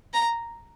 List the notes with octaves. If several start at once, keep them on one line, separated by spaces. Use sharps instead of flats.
A#5